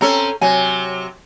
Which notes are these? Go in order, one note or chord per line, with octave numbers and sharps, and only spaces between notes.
C4 C#4 A4 A#5
C3 F#3 G#5